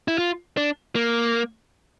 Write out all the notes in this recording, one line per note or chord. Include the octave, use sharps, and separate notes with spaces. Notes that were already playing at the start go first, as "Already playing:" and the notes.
E4
F4
D4
A#3